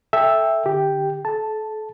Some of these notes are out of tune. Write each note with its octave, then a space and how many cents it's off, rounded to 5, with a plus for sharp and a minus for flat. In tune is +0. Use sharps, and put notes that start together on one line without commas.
A4 +0 E5 +0 G5 +15
D3 +15 G4 +0 G5 +0
A4 -35 A5 +0